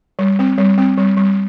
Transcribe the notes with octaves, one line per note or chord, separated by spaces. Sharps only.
G3
C4
G3
C4
G3
G3